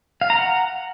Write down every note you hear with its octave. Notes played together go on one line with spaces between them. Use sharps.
F5
A#5
F#5